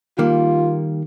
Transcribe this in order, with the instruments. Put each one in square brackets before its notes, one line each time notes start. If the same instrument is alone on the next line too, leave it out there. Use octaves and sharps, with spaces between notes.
[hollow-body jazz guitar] D#3 G3 A#3 [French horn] F4